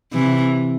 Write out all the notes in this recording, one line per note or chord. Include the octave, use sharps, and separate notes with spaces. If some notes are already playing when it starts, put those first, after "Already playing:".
C3 E3